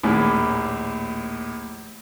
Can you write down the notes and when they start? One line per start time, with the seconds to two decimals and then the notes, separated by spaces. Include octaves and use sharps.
0.03 A#1 D#2 A2